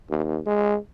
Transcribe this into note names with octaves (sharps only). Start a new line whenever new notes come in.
D#2
G#3